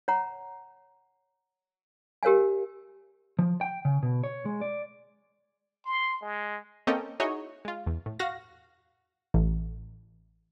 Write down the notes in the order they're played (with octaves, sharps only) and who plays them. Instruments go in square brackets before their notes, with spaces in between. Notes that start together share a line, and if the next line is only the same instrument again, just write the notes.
[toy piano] C#5 F#5 A#5
G4 A#4 C#5 F5 G#5
[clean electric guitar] F3
G5
C#3
B2
C#5
G#3
D5
[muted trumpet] C6
G#3
[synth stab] A#3 C4 C#4 A4 D#5 G5
D#4 E4 F#4 G#4 C#5 D#5
G#3 F4
E2
A2
F#4 F5 A#6
[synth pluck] A1